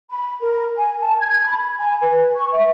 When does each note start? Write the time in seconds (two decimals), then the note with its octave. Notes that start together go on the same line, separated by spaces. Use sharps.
0.10 B5
0.41 A#4
0.76 G#5
1.01 A5
1.20 G#6
1.46 B5
1.79 G#5
2.02 B4
2.36 C#6
2.53 E5